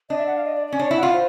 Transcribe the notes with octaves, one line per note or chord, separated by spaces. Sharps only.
D4 D#5
E5
F#5
F5
D#5
D5
D5
C#4
D4 C#5
E4
F#5
F4
C5